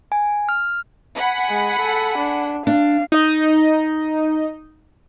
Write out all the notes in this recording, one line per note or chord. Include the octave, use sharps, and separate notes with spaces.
G#5
F6
F#5 G#5 B5
G#3
A4
D4
D4 F5
D#4 D#5